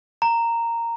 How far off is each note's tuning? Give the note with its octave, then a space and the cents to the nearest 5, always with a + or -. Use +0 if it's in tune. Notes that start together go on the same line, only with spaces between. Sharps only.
A#5 -10